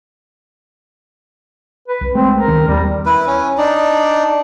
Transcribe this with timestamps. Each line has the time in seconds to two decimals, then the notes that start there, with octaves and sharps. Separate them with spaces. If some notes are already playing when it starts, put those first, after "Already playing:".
1.88 B4
2.01 C2
2.15 G#3 A3 C4
2.36 A#4
2.48 C#2 D#3 C#4
2.68 D#2 G3 B3
3.06 E4 B4
3.27 C#4
3.58 D4 D#4 D5